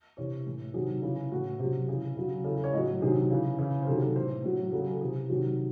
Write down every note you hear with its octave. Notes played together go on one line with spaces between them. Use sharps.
C3 E3 C#5
A2 E3
C3 D#3 F#3 G#4
C#3 E3
A2 E3 F#4
C3 F#3
C#3 E3 G#4
C#3 F#3
C#3 E3 A4
A4
C#5
A2 F#3 D#5
C3 D#3 F#3 G#4
C#3 E3
C#3 E3
C5
C3 D#3 F#3 A4
A4
A2 E3 C5
A2 F#3
C#3 F#3 A4
G#4
A4
C3 E3 G#4
C3 D#3 F#3 F#4